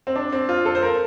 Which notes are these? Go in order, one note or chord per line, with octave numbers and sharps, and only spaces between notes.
C4
D4
C4
F4
A4
C5
A#4